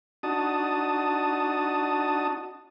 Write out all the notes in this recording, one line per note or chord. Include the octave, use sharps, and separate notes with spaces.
D4 D#4 F#4 A5 D#6